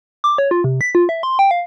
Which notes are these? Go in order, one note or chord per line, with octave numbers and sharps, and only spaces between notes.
D6
C#5
F4
C3
B6
F4
E5
C6
G5
F5